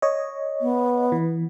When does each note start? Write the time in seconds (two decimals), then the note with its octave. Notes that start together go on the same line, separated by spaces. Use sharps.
0.02 C#5 D#5
0.61 B3
1.12 E3